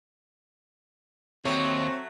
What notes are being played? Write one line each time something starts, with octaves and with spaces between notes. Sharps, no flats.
D#2 F#3 A3 C4 C#5